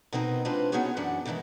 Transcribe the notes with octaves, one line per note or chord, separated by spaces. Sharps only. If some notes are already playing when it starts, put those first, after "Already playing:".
B2 B3 C4 D#4 A#4
G#3 C4 D4 F4 B4
B3 C#4 D#4 F#4 G#4 C#5
F#2 E3 C#4 D4 F#5
B2 D#3 E3 G#3 A3